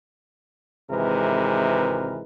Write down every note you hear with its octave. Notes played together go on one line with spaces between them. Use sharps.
G#1 C3 E3 G#3 A#4 B4